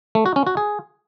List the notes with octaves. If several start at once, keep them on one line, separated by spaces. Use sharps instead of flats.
A3
F#4
C#4
F#4
G#4